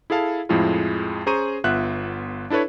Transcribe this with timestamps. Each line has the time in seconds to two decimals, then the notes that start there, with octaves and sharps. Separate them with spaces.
0.10 E4 G#4 A4 F5 A5
0.49 F2 A2 F3 G#3 E4 F4
1.26 C#4 G#4 C5 A#5 C#6 D#7
1.64 G1 B3 F4 E5 F#5 F#6
2.50 D4 E4 A4 B4 C#5